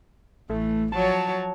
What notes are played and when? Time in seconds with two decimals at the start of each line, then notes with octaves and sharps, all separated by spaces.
0.50 A1 E3 A3
0.92 F3 F#3 C#5 A5